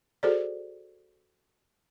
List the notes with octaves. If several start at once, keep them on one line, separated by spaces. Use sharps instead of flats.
F#4 G#4 A4 C5 D5